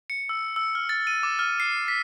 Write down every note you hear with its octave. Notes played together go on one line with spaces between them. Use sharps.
C#7
E6
E6
F6
A6
D#7
D6
F6
C7
B6